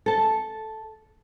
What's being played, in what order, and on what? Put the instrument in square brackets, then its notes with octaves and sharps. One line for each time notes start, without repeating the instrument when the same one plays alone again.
[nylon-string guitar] A4 A5